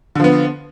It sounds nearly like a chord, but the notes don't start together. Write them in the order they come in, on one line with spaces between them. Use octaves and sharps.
D3 F3 B3